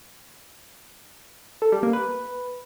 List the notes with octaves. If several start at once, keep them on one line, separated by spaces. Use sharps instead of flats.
A4
G3
A#3
B4